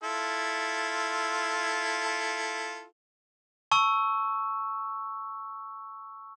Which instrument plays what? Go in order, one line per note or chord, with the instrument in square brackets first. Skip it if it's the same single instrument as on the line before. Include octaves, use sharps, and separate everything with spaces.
[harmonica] E4 F4 A4
[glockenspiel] A5 C#6 E6